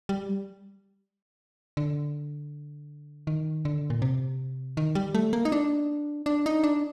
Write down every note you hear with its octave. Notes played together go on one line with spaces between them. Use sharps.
G3
D3
D#3
D3
A#2
C3
D#3
G3
A3
A#3
D#4
D4
D4
D#4
D4